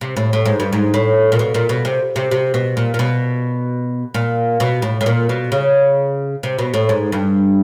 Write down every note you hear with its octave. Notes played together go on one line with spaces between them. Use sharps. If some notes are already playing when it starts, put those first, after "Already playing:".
C3
A2
A2
G#2
G2
G#2
A2
A#2
B2
A#2
B2
C3
C3
C3
B2
A#2
A#2
B2
A#2
B2
A2
A2
A#2
B2
C#3
C3
B2
A2
G#2
G2